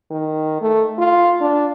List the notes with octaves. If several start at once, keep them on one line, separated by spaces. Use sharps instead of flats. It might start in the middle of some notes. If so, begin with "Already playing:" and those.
D#3
A3
F4
D4